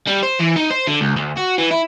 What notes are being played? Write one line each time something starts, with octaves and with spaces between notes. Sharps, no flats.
G3
C5
E3
D#4
C5
D3
C#2
D2
F#4
E3
E4